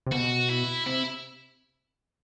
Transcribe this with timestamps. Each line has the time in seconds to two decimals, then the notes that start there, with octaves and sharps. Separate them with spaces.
0.06 C3
0.12 B2 F#4
0.49 E4
0.86 C3 E4